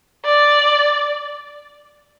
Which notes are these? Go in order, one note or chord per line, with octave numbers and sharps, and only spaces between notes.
D5